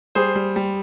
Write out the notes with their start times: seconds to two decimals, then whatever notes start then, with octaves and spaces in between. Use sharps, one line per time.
0.15 G3 G#4 C5
0.35 G3
0.56 G3